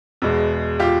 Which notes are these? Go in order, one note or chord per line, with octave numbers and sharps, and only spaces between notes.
E2 B2 G#3
F4 G4